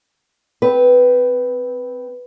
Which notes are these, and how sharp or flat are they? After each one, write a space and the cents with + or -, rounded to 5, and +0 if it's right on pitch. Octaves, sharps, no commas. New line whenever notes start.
C4 -15 B4 +0